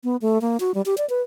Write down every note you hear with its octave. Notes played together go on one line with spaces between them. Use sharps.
B3
A3
A#3
F#4
G3
G4
D5
B4